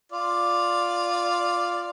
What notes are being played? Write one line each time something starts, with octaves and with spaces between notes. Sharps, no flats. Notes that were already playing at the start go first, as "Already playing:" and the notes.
F4 D5